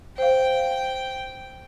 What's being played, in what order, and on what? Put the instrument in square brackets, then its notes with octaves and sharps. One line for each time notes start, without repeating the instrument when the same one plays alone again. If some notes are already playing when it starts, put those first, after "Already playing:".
[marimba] C5 F5 [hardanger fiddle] G5